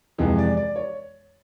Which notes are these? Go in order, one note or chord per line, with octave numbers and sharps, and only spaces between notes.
F2 C3 E3 G#3 B3
D5
D5
C#5